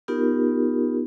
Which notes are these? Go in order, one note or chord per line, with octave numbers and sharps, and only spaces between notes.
B3 D#4 F4 G4 A#4